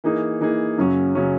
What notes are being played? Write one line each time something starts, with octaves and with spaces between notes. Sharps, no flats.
E3 A#3 D#4 G#4
E3 A#3 D#4 G#4
F#2 C#3 F#3 C#4
C#3 F#3 C#4